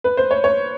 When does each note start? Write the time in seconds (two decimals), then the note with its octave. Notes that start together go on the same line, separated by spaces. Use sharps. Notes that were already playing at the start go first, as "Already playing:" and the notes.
0.04 B4
0.17 C5
0.31 C#5
0.44 C#5